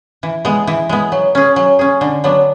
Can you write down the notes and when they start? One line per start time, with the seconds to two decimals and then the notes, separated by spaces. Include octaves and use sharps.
0.23 E3
0.45 G#3 B3
0.67 E3
0.89 G#3 B3
1.12 F#3
1.35 C#4 G#4
1.56 F#3
1.79 C#4 G#4
2.01 D3
2.24 F#3 B3 D4